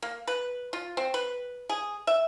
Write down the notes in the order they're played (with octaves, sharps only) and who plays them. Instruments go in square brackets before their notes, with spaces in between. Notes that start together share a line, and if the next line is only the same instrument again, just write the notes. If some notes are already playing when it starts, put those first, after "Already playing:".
[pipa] A#3
B4
F4
C4
B4
G#4
E5